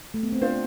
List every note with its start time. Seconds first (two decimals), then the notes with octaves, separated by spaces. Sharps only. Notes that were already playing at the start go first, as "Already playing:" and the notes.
0.14 A3
0.23 B3
0.32 C4
0.41 D4 F4 C5 F5